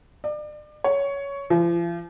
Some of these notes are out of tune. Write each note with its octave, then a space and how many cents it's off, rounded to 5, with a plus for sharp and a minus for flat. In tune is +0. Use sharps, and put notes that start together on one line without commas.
D5 +35
C#5 +10
F3 -40